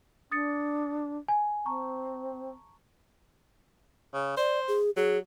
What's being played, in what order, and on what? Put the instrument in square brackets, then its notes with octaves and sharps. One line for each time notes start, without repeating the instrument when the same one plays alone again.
[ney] D4 [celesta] D#6 A6 C#7
[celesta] G#5
[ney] C4 [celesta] A5 A#5 C#6
[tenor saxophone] C#3
[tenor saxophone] C5 [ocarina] D5
[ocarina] G#4
[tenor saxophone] F#3 [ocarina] G#4